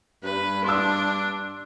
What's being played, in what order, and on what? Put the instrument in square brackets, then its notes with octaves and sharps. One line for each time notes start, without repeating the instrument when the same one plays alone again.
[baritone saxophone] G2 [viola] B4
[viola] D4 [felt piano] C6 E6